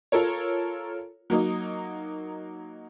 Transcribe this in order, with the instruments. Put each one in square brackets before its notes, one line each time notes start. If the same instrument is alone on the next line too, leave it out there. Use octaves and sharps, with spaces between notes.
[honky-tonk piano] F4 A4 A#4 C#5
F#3 A#3 D#4